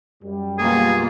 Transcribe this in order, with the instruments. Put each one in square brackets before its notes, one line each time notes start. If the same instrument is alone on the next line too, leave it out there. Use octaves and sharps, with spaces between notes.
[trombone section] F#2 G3
[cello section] B2 A#3 F4 [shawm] G#4